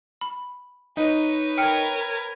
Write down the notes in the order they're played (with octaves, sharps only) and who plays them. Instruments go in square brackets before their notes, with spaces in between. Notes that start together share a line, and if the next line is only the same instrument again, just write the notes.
[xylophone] B5
[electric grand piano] D#4 D#5 [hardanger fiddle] B4 C#5
[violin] A#4 G#6 [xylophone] G5 F6 C#7